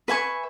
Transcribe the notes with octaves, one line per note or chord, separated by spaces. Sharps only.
B4 E5 G#5 C#6